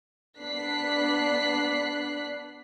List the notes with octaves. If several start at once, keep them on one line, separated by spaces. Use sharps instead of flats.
B3 D4 F#6 B6 C7